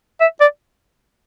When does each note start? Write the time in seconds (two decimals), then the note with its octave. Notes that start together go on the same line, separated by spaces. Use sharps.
0.21 E5
0.41 D5